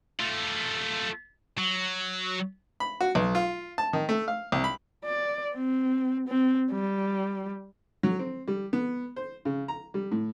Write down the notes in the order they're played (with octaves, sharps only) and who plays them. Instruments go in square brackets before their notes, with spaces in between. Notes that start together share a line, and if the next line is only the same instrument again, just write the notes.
[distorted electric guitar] A3 F4
F#3
[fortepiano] B5
F#4
B1
F4
A5
D#3
A3
F5
C2
B5
[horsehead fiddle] D5
C4
C4
G3
[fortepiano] F#3
C4
G3
B3
C5
C#3
A#5
G3
A2